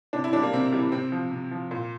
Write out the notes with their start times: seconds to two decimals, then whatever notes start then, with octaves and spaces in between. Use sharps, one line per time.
0.13 C3 D4
0.24 E4
0.33 E3 G3 D4
0.43 A#3
0.53 C3 C4
0.73 E3 G3
0.92 C3 C4
1.12 F3
1.31 C3
1.51 F3
1.71 A#2